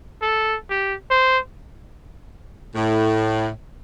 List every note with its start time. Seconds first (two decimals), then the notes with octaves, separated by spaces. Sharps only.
0.22 A4
0.70 G4
1.11 C5
2.75 A2